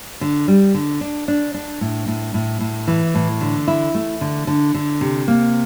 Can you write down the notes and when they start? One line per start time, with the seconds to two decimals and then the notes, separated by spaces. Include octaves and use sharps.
0.21 D3
0.48 G3
0.74 D3
1.01 D4
1.28 D4
1.54 D4
1.81 A2
2.08 A2
2.34 A2
2.61 A2
2.88 E3
3.15 A2
3.41 D3
3.67 E4
3.95 A3
4.21 D3
4.47 D3
4.74 D3
5.01 C3
5.28 A#3